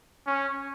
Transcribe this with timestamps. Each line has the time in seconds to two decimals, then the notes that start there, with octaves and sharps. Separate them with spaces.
0.27 C#4